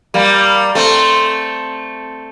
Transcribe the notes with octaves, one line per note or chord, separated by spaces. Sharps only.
G3 A#3
A3 C4